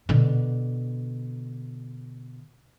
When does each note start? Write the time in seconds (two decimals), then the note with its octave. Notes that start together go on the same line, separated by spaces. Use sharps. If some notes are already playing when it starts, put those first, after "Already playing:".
0.09 B2 D3